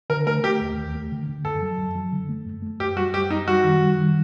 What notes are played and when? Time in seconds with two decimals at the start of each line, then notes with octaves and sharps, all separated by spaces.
0.10 D3 A#4
0.27 A3 A#4
0.44 A3 G4
0.61 D#2
0.78 D#2
0.95 A3
1.12 D3
1.29 D3
1.45 F#2 A4
1.62 F#3
1.78 F#2
1.95 F#3
2.12 D3
2.29 A3
2.47 F#2
2.63 A3
2.79 F#2 G4
2.96 G3 F#4
3.13 F#2 G4
3.30 F#2 D#4
3.48 G3 F#4
3.64 D#3
3.81 G3
3.98 D#3